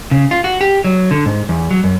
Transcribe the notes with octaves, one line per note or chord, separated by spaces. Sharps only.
C#3
F4
F#4
G4
F#3
D3
G#2
E2
F#3
F#2